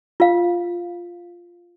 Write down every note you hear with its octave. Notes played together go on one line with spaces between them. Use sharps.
F4 F5